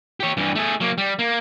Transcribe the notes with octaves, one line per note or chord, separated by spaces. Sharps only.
G4 C#5
G2 E3
A3 G#4
F#3 A#3
G3
A#3